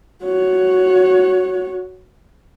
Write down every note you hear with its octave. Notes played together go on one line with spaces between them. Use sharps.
F#4 C#5